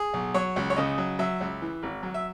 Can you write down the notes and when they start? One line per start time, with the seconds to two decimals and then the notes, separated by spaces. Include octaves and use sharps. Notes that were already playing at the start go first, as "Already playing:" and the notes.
Already playing: G#4
0.13 B1
0.34 F#3 C#5
0.56 C#2
0.70 C#5
0.76 C#3 D#5
0.98 F#3
1.19 F#3 E5
1.41 C#2
1.62 E3
1.83 G#1
2.03 F#3
2.14 E5